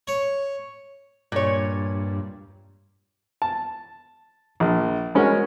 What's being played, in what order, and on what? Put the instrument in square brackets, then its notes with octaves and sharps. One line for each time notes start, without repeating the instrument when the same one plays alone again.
[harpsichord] C#5
[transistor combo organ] G2 [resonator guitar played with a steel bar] A#2 C#5
[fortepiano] A5
A#1
G#3 C#4 F#4 A#4